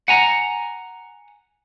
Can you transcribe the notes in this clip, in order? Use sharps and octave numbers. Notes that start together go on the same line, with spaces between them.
F#5 G#5 A#5